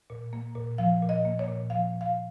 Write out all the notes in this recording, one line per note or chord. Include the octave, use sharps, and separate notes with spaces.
A#2
A#3
A#2
F3 F5
A#2
D#5
A#3
C#5
A#2
F3 F5
A#2
F5